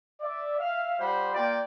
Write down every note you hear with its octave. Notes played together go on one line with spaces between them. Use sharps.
D5 E5
E5 F5
G3 F4 C5 F#5 B5
A#3 F4 D5 G5